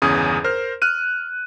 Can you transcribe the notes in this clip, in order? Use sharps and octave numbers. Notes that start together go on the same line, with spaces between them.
G1 E2 C#3 C#4 G#4 D#6
A#4 C5 F6
F6 F#6 D#7